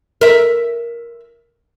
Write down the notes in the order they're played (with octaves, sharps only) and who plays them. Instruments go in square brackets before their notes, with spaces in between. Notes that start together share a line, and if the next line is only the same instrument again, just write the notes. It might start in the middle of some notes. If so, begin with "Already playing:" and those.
[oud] A#4 E5